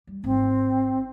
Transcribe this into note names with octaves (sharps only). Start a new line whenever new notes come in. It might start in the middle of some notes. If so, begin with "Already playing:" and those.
G3
G#1 C4